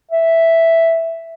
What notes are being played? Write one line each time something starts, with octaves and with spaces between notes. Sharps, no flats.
E5